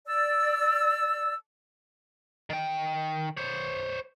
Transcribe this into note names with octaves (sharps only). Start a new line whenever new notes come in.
D5 E6
D#3 G5
C5 C#5